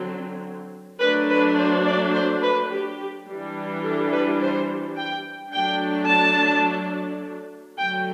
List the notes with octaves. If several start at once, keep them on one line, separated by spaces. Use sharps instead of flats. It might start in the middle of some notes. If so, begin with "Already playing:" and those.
Already playing: D3 F#3 C4
F#3 A3 D4 B4
B4
C5
D5
C5
B4
G4
E3 G3 D4
A4
B4
C5
G5
F#3 A3 D4 G5
A5
D3 F#3 A3 G5